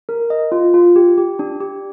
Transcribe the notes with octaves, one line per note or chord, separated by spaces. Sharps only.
A#4
D#5
F4
F4
G4
G4
D4
G4